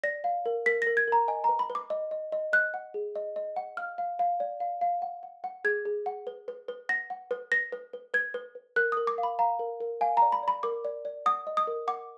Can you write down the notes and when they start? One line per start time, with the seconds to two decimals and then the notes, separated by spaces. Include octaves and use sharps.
0.03 D5 A#6
0.24 F5
0.46 A#4
0.66 A#4 B6
0.82 A#6
0.87 A#4
0.97 G#6
1.08 A#4 A#5
1.28 D#5 G#5
1.44 A#5
1.49 B4
1.59 B5
1.70 B4
1.75 D6
1.90 D#5
2.11 D#5
2.32 D#5
2.53 D#5 F#6
2.74 F#5
2.94 G#4
3.16 D#5
3.36 D#5
3.56 F#5
3.77 F5 F6
3.98 F5
4.19 F5
4.40 D5
4.60 F5
4.81 F5
5.02 F#5
5.23 F#5
5.44 F#5
5.64 G#4 G#6
5.85 G#4
6.06 F#5
6.27 B4
6.48 B4
6.68 B4
6.89 F#5 A#6
7.10 F#5
7.31 B4
7.52 B4 A#6
7.72 B4
7.93 B4
8.14 B4 G#6
8.34 B4
8.55 B4
8.76 A#4 F#6
8.92 D#6
8.97 A#4
9.07 D6
9.18 F5
9.23 B5
9.39 F5 A#5
9.59 A#4
9.81 A#4
10.01 F5 G#5
10.17 A#5
10.22 D5
10.32 B5
10.43 D5 B5
10.63 A#4 D6
10.85 D5
11.05 D5
11.26 F#5 D#6
11.47 D#5
11.57 D#6
11.67 A#4
11.88 F#5 D6